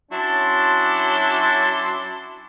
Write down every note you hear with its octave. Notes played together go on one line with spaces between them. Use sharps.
F#3 C#4 D4 E4 A5 C6